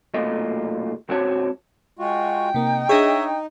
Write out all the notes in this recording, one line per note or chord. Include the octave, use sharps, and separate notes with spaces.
B1 E2 A#2 A3 F4 D#5
C#2 G#2 C4 F#4 C#5 A5
G#3 F4 F#4 G5
C3 A#3 D#4
D4 G#4 C#5 D#5 E5